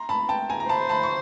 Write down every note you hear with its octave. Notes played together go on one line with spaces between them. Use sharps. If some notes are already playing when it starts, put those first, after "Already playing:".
Already playing: A#5 C6
A5 B5
G5 A5
G#5 A#5
A#5
C5 A5 B5
A5 B5
C#6